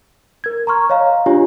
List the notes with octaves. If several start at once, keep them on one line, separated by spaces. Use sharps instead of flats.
A#4 G#6
A#5 C6 C#6 F6
C#5 D#5 F5 A#5
D4 F4 G4 C#5 G#5